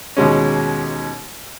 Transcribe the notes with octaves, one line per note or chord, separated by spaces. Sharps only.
D#2 B2 G#3 C#4